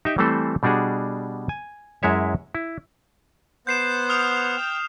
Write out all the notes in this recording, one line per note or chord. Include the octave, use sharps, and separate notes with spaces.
D#4 G4 E5 G5
E3 G3 A3 C4 A4 C5
B2 G3 D4 F#4 G#4
G#5
F#2 G#3 E4 C#5 E5
E4
B3 C5 F#5 G6 C7 E7
D#6 F6 F7
G5